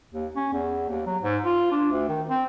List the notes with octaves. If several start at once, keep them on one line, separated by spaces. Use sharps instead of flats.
D#2
C#4
E2
D#2
F#3
G#2
F4
D4
D2
D#3
C4